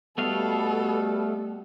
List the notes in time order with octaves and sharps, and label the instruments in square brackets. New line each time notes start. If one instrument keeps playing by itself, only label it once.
[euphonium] B2 [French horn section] G3 [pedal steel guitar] A3 B3 F5 [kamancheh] A4